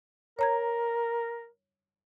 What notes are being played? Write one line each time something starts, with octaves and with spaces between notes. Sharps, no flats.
A#4 C#5 A#5 G#6